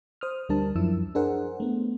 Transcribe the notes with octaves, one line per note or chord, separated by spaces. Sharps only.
C5 D#6 F6
D2 G3 D4 A#4 A5
F#2 F3 E4 E6
D4 G#4 A#4 C5 F#5
A3 B3